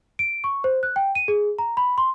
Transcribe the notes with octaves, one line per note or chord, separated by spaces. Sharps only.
D7
C#6
C5
F#6
G5
D#7
G#4
A#5
B5
C6